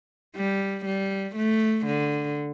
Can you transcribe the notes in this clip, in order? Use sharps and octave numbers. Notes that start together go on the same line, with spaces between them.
G3
G3
A3
D3